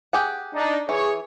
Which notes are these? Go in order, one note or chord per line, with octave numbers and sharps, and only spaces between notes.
G4 G#4 F#5
D4 D#4
E3 G#4 C#5